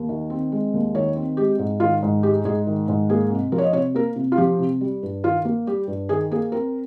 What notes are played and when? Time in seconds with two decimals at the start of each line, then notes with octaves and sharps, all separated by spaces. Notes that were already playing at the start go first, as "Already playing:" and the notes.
Already playing: D#2
0.09 D#3
0.30 C4
0.52 G#3
0.74 D#2
0.95 D#3 C#5
1.16 C4
1.37 G#3 G4
1.59 G#2
1.80 D#3 F4
2.03 G#2
2.23 G#3 G4
2.45 G#2 G#4
2.67 D#3
2.88 G#2
3.10 A#3 G#4
3.31 C3
3.52 F3 A#4
3.58 C#5
3.63 D#5
3.73 C3 C#5
3.94 A#3 A#4
4.16 C3
4.32 F4
4.37 F3 G4
4.59 C3
4.81 G3
5.03 G2
5.23 D#3 F4
5.45 A#3
5.67 G3 G4
5.88 G2
6.09 D#3 G#4
6.31 A#3 G#4
6.52 C4 A#4